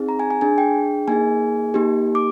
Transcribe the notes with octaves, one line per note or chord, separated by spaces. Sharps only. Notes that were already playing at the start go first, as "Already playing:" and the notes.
Already playing: C4 D#4 G#4
A#5
G#5
G#5
D4 G#4 G#5
G5
A#3 D#4 G#4 G#5
A#3 D#4 G4
D6